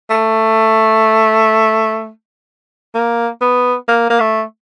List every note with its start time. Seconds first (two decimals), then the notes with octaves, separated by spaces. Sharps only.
0.10 A3
2.95 A#3
3.41 B3
3.88 A#3
4.10 A#3
4.20 A3